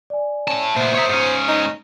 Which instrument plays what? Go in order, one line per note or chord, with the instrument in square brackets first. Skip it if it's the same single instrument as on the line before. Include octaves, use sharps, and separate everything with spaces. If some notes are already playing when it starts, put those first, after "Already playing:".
[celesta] D5 G#5
[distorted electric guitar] A2 A5 [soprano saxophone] C#4
[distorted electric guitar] A#2 B3 [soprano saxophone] C5 [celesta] E5
[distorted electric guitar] C#5 E5 [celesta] A#5 D#6 C#7
[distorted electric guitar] G#2 C#4
[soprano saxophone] D#4